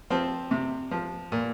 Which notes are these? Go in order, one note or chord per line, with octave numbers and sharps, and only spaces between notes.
F3 C4
C3
F3
A#2